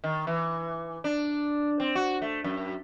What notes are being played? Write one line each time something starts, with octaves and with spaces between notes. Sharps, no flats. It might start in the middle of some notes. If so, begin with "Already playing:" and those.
D#3
E3
D4
C4
F#4
A3
F#2